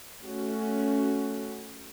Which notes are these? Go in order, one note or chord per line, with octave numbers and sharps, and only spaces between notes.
A3 C#4 F#4